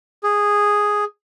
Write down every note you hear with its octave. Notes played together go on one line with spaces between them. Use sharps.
G#4